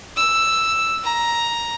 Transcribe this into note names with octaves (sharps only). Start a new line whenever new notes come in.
E6
A#5